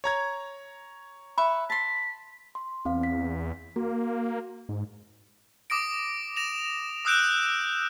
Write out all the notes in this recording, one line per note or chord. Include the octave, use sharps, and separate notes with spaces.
C#5 A#5 G#6
B4 E5 B5 C#6
A5 C6 B6
C6
E2 C4 F5
B6
A#3 F#4
G#2
D6 D#6 A#6 D7
A#6 E7 F7
D#6 E6 F#6 G6 D7 E7